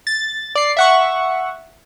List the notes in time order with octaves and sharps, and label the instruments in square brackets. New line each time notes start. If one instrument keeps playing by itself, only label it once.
[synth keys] A6
D5 C7
E5 F#5 C#6